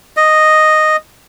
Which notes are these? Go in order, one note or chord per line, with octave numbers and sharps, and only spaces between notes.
D#5